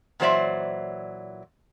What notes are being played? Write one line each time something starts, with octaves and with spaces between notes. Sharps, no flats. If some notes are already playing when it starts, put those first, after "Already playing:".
A#2 E3 F#3 C5 D5 E5